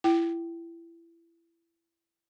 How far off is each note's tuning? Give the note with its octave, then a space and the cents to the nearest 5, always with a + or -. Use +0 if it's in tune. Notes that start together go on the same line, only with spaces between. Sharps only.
E4 +25 G5 -20